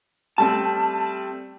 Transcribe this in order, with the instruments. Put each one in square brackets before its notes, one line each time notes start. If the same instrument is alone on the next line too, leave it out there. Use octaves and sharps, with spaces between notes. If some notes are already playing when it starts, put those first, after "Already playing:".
[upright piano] G3 A3 C4 [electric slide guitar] A5